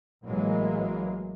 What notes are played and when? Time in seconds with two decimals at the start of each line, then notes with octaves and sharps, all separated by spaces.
0.24 A1 E3 F#3 G#3 A#3